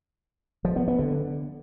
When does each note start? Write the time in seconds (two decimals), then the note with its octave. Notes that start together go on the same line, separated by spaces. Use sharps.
0.65 F3
0.76 B3
0.88 B3
0.99 D3